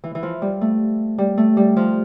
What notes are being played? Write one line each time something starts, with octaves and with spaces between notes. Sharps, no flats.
E3
E3
F3
G3
A3
G3
A3
G3
F3